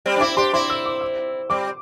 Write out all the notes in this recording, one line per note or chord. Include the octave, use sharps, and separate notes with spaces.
G3 C4
D4
C4 E4 D6
D4 G4 C6
C4 E4 C6
E6
D6
E6
G3 C4 D6